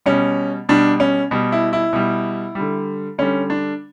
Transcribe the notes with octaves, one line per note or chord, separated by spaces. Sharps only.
B2 G3 C#4
B2 G3 D4
C#4
B2 G3
E4
E4
B2 G3
D3 G3
D3 G3 C#4
D4